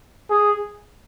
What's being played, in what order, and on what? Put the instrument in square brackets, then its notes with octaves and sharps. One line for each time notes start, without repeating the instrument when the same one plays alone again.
[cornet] G#4